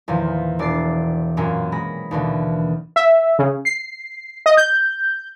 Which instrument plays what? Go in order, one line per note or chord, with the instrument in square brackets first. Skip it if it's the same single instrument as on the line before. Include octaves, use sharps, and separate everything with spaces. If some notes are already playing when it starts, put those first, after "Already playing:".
[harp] E2 A#2 D#3 F3
E1 D5 A6 C7
F#2 A#2 A#3 C#4
G#3 B5 A#6
D#2 B2 D3 E3
[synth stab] E5
C#3
C7
D#5
G6